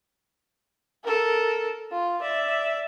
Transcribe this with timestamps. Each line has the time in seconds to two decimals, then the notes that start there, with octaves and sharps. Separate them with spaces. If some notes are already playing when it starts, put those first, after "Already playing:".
1.04 A4 A#4
1.91 F4
2.21 D5 E5